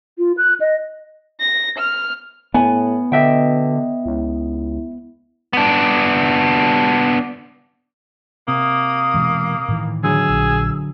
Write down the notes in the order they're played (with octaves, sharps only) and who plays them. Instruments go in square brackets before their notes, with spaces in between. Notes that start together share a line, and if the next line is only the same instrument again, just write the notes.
[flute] F4
F#6
D#5
[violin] A#6
F6
[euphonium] A2 [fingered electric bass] B3 [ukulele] G#5
[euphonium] B2 [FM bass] D3 [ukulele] D#5 E5 G5
[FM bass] C#2 [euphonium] E4
[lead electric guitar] B3 D4
[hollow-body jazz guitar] C3 [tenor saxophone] A#3 [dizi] D#6
[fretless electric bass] B2 E3 G#3
A2 D#3 E3
[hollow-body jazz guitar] D3 F#3 [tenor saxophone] G#4 [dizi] E6
[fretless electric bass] A#1